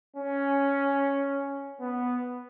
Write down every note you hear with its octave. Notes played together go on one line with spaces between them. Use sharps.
C#4
B3